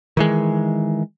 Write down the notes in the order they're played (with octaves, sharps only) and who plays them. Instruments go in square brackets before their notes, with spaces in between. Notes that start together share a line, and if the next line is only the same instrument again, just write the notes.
[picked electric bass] D#3 E3 G#3